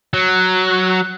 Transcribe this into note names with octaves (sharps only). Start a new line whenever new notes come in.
F#3 F#6